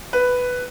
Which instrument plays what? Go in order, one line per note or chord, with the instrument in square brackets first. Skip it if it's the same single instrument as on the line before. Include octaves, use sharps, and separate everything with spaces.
[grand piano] B4